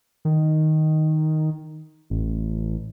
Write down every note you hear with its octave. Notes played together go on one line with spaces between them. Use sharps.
D#3
A1